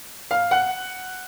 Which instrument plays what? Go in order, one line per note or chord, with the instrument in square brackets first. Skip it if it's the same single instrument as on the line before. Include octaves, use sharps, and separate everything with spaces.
[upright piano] F5
F#5